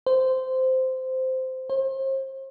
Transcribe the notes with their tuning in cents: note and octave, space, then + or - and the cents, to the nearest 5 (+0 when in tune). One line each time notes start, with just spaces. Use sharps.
C5 -10
C5 +40